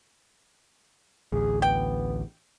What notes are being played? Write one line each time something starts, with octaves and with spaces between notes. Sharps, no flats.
A1 D2 G#4
B3 G5